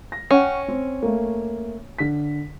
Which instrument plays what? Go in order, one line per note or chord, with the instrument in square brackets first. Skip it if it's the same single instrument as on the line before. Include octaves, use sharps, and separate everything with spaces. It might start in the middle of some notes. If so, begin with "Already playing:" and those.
[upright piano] A#6
[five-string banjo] C#4 [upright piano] F#5 G5 C#6
[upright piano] C4
A3 A#3
D3 B6